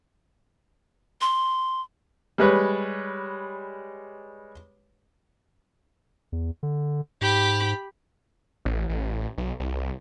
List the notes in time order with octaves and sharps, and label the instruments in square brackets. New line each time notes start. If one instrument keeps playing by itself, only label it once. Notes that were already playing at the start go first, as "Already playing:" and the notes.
[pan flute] C6
[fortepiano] G3 G#3 B4 C#5
[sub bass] E2
D3
[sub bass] G#2 [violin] G4 B5
[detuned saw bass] A1
A1
B1
C2